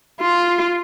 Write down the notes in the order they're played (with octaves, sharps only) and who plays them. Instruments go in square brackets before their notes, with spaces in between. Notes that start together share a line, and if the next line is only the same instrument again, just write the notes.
[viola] F4 C6